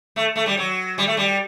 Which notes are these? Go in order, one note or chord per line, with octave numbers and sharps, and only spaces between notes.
A3
A3
G3
F#3
G3
A3
G3